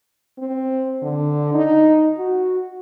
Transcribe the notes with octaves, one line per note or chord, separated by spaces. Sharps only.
C4
D3
D#4
F#4